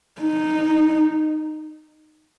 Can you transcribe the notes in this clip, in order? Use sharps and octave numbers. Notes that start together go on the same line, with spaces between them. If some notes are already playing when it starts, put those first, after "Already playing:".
D#4